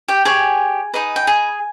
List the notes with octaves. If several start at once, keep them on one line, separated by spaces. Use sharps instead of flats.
G4 G5
G4 G#4 C#5 G#5
D#4 G#4 B4 D#5
G5
G#4 G#5